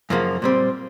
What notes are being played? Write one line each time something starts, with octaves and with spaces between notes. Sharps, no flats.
F#2 C#3 F3 A#3
A#2 G3 C4